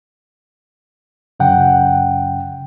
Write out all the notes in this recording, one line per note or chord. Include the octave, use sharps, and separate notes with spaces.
F#2 C#3 F#5 G5